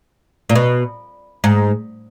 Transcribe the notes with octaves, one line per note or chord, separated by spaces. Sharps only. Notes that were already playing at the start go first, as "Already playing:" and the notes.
A#2
B2
G#2